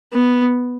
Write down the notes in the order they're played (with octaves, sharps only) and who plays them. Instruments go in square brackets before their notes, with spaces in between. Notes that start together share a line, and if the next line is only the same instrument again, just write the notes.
[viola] B3